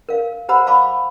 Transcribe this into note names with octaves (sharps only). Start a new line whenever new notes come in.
A#4 F5
G4 C5 F#5 A#5 B5 E6
F5 A5 B5 D6